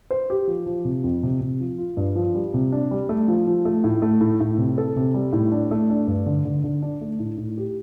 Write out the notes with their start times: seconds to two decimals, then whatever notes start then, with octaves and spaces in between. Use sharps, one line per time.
0.11 C5
0.30 G4
0.47 F3
0.66 F3
0.85 C3
1.04 F2
1.23 C3
1.41 C3
1.60 F3
1.78 F4
1.97 G2
2.15 F3
2.35 G3
2.54 C3
2.72 D4
2.91 G3
3.09 A3
3.28 F3
3.47 F3
3.65 A3
3.84 A2
4.02 A3
4.21 A2
4.40 A2
4.58 C3
4.78 A4
4.96 C3
5.14 G3
5.33 A2
5.52 D4
5.71 A3
5.90 D4
6.07 G2
6.26 D3
6.45 D3
6.64 D3
6.82 D4
7.01 A3
7.19 A2
7.38 A2
7.58 G4